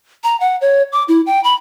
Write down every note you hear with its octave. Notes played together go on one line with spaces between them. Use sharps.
A#5
F#5
C#5
D6
E4
G5
B5